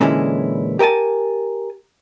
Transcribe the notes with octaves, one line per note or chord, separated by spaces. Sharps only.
A#2 D3 E3 G#3 C#4 E4
G4 A#4 D#5 G#5 A5